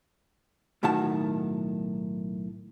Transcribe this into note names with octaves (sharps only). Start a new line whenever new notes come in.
B1 A2 D#3 F#4 A5